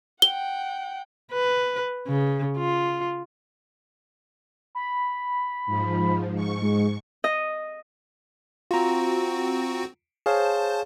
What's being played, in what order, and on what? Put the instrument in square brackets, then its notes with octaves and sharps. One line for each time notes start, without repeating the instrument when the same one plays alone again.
[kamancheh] F#5 G5 [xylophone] G7
[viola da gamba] B4
C#3
F4
[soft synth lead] B5
[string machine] G#2 F3
G#2 C#6
[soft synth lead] G#3
[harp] D#5
[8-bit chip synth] C4 F#4 [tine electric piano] F4 A#5
[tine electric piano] G#4 C#5 F5 [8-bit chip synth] C5 A5